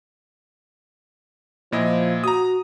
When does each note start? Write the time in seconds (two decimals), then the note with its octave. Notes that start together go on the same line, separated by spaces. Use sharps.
1.72 A#2 F3 E4 D#5
2.24 F#4 A#5 D#6